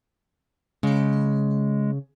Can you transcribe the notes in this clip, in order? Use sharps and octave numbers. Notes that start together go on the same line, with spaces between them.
C#3 G#3